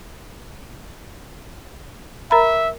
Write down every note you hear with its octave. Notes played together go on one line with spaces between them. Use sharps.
A#4 E5 A#5 B5